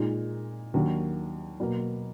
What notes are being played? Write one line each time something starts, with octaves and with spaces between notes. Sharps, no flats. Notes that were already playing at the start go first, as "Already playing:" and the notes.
Already playing: A#2 G#3 D#4
D#2 D#3 F#3 A#3 D4
B2 F#3 A#3